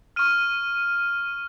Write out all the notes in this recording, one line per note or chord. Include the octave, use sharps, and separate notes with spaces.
C#6 F6 D#7